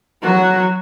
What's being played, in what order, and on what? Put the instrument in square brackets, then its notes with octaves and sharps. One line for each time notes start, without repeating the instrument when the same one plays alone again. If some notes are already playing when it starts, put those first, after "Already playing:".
[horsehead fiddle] F#3 F#4